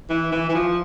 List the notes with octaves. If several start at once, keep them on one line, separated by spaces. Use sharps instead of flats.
E3
E3
E3
F3